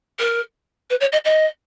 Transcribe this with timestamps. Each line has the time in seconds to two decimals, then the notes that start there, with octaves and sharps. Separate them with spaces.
0.19 A#4
0.90 B4
1.00 C#5
1.12 D#5
1.25 D#5